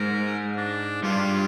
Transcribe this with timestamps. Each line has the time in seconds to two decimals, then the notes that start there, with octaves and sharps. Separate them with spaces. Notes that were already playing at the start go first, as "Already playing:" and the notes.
Already playing: G#2 G#3 A#4
0.57 D4
1.03 G2 G3 F4